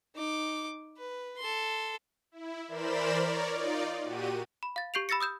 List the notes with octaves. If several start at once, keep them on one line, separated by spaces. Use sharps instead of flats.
D#4 D6
B4
A4 C6
E4
E3 A#4 C5 D5 B5 E7
A#4 C#5 D5
D#4 F4 D5
A#2 F#4 G4 D#7
B5
F5 A6
G4 C#6 G6 C7 D7 F7
B5 E6 A6 A#6 C#7
D#6 E6 G6 E7